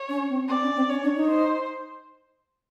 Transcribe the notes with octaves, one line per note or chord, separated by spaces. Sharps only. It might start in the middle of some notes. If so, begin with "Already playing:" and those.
Already playing: C#5
C#4
C4
C4 D5
C#4
C4
C#4 C#5
D4
D#4
C5